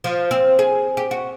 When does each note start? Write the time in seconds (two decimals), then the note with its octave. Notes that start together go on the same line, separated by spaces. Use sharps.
0.04 F3
0.31 C4
0.59 G#4
0.97 G4
1.11 F#4